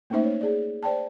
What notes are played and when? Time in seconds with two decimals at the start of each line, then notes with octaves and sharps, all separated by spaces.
0.10 A3 A#3 C#4 D#4 C5 E5
0.24 C#5
0.41 G#4 D5
0.83 C5 D5 G5 A5